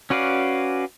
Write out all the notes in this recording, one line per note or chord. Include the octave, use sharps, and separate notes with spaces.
C#4 F#4 B4 D5 F5